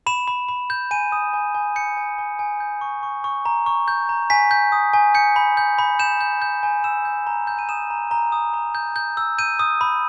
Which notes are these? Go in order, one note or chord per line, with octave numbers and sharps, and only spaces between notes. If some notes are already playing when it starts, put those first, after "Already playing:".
B5 E7
B5
B5
G6
G#5 D#7
D#6
G#5
G#5
G6 C#7
G#5
G#5
G#5
G6
C#6
C#6
C#6
A#5
C#6
G6
A#5
G#5 B6
G6
D#6
G#5
G6 C#7
B5
G6
B5
G6 E7
G6
G6
G#5
E6 E7
G6
A#5
G6
D#7
D#6 E7
A#5
A#5
D#6
A#5
G6
G6
E6
G6 D#7
D#6
B5